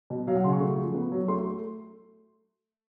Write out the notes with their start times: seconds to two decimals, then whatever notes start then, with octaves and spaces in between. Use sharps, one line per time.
0.10 B2
0.27 F#3 F5
0.36 F#5
0.44 C#3 C6
0.52 C#6
0.60 A3
0.78 F3
0.94 B3
1.12 F#3
1.28 A3 C6